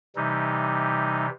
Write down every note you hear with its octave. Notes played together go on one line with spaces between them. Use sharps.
C3 E3 G3 D#4